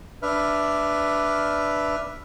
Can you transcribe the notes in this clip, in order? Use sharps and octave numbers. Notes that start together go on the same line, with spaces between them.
D4 B4 E5 F6